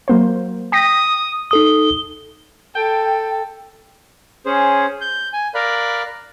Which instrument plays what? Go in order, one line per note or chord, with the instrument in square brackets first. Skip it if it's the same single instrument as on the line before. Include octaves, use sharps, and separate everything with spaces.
[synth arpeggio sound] F#3 A#3 C5
[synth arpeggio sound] G5 A#6 B6 [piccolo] D#6
[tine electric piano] D#4 A4 D#6 [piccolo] G7
[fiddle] A4 [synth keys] G5
[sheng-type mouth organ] C#4 G#4 C5
G6
G#5
A#4 D5 F5 B5 F#6